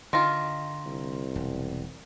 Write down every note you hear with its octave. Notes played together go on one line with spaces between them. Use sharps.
D3 D#3 F4 C6 A#6
C2
E1